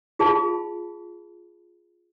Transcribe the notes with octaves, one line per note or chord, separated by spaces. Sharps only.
F4 G#4 F5 A5 B5